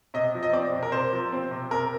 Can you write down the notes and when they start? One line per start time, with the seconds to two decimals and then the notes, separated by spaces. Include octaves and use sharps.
0.14 C3 D#5
0.34 F3
0.43 D#5
0.53 C4 D5
0.72 C3
0.83 A#4
0.92 C3 C5
1.12 F3
1.32 C4
1.51 C3
1.71 C3 A#4